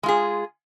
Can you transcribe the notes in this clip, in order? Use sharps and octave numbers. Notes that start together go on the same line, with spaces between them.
G#3 F4 G#4